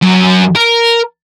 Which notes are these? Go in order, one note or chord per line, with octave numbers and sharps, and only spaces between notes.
F#2
A#4